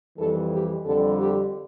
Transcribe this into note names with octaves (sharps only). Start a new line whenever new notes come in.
F2 E3 G3 A4
G4
F2 D3 G3 A4
G4